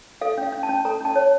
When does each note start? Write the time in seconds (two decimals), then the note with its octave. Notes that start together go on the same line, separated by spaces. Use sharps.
0.21 A4 F5
0.38 C#4
0.43 F5
0.52 C#4
0.63 A5
0.69 C#4
0.85 A4 A#5
1.01 C#4 A5
1.16 C#5